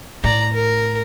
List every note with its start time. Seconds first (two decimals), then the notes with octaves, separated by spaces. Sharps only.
0.24 A2 D5 A#5
0.54 A#4